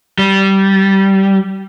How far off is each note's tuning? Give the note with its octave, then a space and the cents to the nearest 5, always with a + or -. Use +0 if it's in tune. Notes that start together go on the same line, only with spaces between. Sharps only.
G3 -15